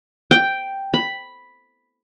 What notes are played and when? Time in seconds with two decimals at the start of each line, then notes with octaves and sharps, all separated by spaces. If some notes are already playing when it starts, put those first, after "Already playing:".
0.31 G5
0.94 B5